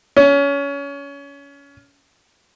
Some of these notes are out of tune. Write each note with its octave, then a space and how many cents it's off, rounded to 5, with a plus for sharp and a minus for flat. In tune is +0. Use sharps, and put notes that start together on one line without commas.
C#4 +25